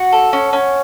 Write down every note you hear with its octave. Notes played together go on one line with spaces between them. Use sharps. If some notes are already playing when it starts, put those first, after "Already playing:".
Already playing: F#4 F#5
A4
C#4
C#4